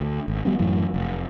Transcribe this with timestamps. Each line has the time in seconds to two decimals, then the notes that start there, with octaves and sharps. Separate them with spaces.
0.01 D2
0.28 G#1
0.45 F#3 G3 B3 C4
0.59 F#2 A2 E3 F#3
0.94 F1